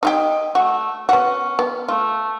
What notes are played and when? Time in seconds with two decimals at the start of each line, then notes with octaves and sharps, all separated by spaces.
0.03 D#4 F4 G4 D#5
0.55 A3 F#4
1.09 B3 C#4 F#4
1.59 B3
1.88 A3 F4